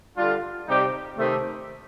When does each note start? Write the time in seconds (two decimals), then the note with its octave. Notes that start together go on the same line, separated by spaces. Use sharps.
0.17 D3 G3 D4 F4
0.67 C3 G3 C4 D#4 G4
1.17 C3 D#3 A3